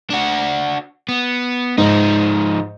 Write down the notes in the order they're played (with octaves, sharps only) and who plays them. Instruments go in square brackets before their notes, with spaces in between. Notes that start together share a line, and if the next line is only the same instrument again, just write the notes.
[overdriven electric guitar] D4 F#4
B3
[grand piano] G#2 [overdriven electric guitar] F3 D#4